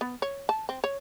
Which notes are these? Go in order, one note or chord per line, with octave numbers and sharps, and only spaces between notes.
B3
C#5
A5
C4
C#5